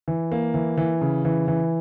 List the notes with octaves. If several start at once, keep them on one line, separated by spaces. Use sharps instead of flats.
E3
A#3
E3
E3
C#3
E3
E3